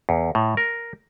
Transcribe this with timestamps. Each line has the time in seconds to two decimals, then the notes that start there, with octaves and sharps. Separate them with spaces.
0.09 E2
0.35 A2
0.57 A#4